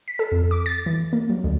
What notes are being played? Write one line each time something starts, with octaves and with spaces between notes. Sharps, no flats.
B6
A4
F2
D6
A6
E3
A#3
F#3
D2